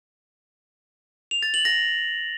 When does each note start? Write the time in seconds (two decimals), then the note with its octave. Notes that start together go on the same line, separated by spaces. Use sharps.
1.31 F7
1.43 A6
1.54 F#7
1.65 A#6